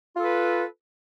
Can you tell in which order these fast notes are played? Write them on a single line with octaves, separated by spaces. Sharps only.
F4 A4 B4